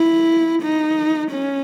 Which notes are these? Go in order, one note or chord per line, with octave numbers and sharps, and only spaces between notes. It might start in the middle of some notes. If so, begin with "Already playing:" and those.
Already playing: E4
D#4
C#4